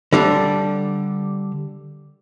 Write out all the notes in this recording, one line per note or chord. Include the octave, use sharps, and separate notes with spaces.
D3 G3 D4